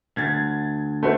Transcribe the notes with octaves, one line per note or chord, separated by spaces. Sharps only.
D2 G#6 A6
A3 F#4 C5